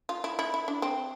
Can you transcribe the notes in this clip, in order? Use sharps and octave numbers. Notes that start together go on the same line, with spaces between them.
F4
E4
E4
E4
D4
C4